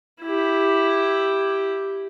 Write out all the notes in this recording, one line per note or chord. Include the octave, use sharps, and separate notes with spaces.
E4 G4